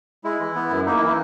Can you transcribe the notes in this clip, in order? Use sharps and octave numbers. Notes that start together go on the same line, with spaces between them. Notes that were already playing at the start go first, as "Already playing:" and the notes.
G#3 E4
E3
B3
F#2
A#3 D#4
E4
E3
E4